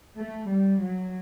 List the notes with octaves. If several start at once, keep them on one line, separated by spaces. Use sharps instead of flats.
A3
G3
F#3